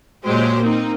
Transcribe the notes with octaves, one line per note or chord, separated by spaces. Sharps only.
A#2 F#3 G#3 G4 C5
A#3 C4 D#4